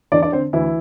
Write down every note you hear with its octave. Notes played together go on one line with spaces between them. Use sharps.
E2 D4 D5
D4 D5
D3 C4 C5
D2 E3 E4